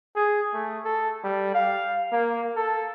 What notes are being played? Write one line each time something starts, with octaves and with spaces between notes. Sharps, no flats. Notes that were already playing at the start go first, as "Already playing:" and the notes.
G#4
A3
A4
G3
F5
A#3
A4